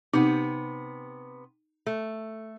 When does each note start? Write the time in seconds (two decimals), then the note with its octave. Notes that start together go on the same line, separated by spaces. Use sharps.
0.14 C3 B3 D#4
1.86 A3